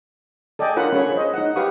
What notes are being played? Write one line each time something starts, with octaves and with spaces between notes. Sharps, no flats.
A4 D5 D#5 G5 G#5
D4 F4 A#4 C#5 F#5 B5
C#4 G#4 C#5 B5
C5 D#5
D#4 F#5
G4 B4 F5 F#5 C#6 D#6